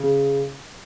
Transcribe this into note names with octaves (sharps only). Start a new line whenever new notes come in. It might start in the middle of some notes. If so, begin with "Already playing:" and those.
Already playing: C#3